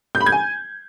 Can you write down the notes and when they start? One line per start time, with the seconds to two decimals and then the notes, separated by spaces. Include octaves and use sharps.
0.15 G6
0.21 B5
0.26 G#6
0.32 G#5